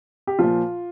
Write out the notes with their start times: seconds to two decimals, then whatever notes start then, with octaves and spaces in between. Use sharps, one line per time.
0.27 G4
0.39 A#2 F3 F4